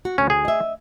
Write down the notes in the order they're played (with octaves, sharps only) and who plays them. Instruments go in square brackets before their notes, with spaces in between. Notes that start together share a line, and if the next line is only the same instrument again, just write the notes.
[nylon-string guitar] F#4
[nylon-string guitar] D2 [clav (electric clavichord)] C#4
[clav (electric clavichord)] G#4
[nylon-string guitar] D#5 E5